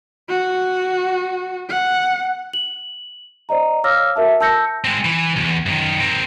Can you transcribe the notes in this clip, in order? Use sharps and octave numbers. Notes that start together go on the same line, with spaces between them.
F#4
F#5
F#7
C5 D5 D#5 A#5
C#5 F5 D6 E6 F6 A#6
F#4 A#4 E5 A5
A5 E6 G6 A#6 C#7
G#3 C4
E3
B1 E2
F#2 D#3
C4 A#4